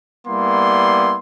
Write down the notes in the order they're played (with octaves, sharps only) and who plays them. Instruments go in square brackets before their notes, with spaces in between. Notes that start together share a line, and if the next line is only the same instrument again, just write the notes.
[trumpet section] G3 A#3 B3 E4 C6